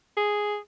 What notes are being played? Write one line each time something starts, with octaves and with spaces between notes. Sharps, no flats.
G#4